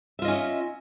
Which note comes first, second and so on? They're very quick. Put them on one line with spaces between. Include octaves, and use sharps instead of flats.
E5 F4 D#5 C#4